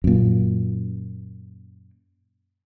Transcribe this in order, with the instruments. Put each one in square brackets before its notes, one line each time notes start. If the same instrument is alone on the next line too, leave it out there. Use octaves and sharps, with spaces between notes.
[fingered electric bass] F#2 A#2